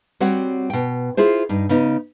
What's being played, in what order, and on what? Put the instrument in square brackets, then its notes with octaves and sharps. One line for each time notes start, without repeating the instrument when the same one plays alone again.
[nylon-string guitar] G3 C4 F#4 C#5 F#5
B2 G5
E4 F4 G#4 C5
G2 D#4
C#3 B3 D#4